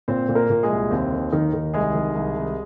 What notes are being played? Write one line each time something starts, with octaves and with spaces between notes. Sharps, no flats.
A#2 C4 C5
A#2
A#3 A#4
A#2
G#3 G#4
C2
D#2 C4
D#3
D#2 D#3 D#4
D#3
C2 G#3 G#4
D#3
C2
C2